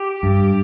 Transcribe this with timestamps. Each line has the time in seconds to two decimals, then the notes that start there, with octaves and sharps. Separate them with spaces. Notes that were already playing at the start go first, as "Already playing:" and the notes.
Already playing: G4
0.23 G2